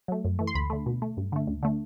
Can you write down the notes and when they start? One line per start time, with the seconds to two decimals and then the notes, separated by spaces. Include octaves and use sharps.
0.08 F#3 A3
0.24 F#2
0.39 E3 A3
0.47 C6
0.55 D2 B5
0.70 D3 A3
0.86 B2
1.02 A3
1.17 G2
1.32 D3 A3
1.47 D2
1.63 D3 A3